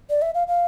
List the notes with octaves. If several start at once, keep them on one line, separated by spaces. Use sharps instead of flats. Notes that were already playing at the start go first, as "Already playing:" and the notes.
D5
E5
F5
F5